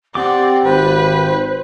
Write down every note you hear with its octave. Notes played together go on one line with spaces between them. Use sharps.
C4 G4 D5 F#5 D6
G#1 B4 C5